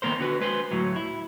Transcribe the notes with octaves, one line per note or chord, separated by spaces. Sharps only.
D#3 A#3 B3 A#4 C5
D3 F#4 B4
G#3 B4 C5
D2 A2 F#3
E4